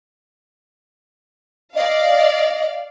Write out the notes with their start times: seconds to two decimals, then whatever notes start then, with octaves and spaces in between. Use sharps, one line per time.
1.75 D5 D#5 F5